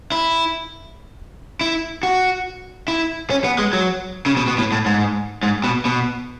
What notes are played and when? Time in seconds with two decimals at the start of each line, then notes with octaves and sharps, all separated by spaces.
0.12 E4
1.61 E4
2.03 F#4
2.88 E4
3.30 C#4
3.44 B3
3.58 G#3
3.73 F#3
4.26 C#3
4.37 B2
4.48 B2
4.58 A2
4.72 A2
4.86 G#2
5.43 G#2
5.64 B2
5.85 B2